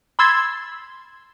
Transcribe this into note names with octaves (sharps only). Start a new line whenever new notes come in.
B5 C6 E6 G#6 A6